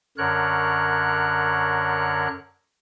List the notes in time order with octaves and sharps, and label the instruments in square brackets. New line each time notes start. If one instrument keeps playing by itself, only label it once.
[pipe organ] F#2 D3 A#4 C#5 F#6